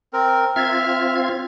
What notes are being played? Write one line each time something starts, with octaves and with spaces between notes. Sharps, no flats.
C4 A#4
C4 F4 E5 F6 G#6